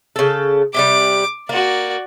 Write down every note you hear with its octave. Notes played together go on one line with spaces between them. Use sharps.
C#3 A4
C3 F#3 G3 D6
A#3 F#4 D5